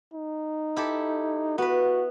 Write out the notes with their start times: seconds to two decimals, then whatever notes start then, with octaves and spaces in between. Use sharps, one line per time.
0.13 D#4
0.76 E4 G4 A4
1.58 B3 F#4 B4